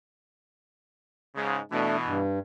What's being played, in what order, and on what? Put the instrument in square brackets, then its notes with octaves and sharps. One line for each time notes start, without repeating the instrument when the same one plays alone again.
[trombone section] G#2 C#3
[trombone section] B2 E3 [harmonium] A3 D4
[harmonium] G2